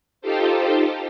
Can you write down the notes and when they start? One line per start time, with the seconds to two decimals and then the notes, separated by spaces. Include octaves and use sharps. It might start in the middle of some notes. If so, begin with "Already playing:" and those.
0.21 D#4 F4 G4 A4 C5